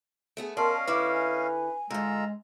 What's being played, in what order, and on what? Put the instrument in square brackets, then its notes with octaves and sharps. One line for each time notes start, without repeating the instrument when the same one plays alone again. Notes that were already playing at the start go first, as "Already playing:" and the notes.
[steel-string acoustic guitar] A3 B3 G#4
[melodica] C#4 D#5 F5 [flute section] A#4 A5 C6 [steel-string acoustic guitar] D5
[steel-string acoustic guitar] D3 E4 [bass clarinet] B4 [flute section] D6
[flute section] G#5
[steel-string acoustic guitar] G#2 D3 [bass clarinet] G#3 [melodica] F4 A#5 E6